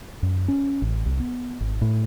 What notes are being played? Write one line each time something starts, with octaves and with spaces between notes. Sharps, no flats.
F#2
C#4
A1
C2
B3
G#1
A2